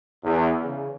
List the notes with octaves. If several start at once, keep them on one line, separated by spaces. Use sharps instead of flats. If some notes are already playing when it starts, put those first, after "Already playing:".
E2
C#3